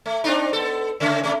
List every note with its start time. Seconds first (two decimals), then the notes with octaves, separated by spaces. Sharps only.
0.06 A3
0.24 C4 D4 D#4
0.53 B3 A4
1.00 C#3 A3 C#4
1.24 C3 A3